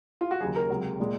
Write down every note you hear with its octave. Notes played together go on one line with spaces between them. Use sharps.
F4
F#4
D#2 C#3 F#3 G#4
A#4
C#2 C3 F#3
A#2 G#3